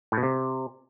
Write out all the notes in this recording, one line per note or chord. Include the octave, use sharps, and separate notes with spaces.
A2
B2
C3